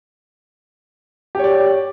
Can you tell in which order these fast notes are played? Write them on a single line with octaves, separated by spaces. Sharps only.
G4 C#5 D5